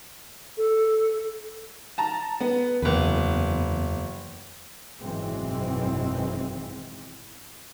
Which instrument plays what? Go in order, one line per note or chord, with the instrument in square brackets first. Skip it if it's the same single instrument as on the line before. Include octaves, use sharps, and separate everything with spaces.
[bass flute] A4
[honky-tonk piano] A5 A#5
B3
[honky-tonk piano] F#1 B4 [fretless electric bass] E2
[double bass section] G#1 F#2 B2 E3 G#3 C4